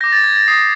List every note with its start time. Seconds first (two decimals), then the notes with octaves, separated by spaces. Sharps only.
0.01 G6 A#6
0.04 D6
0.12 A6
0.24 G#6
0.36 A6
0.48 D#6 G6 C7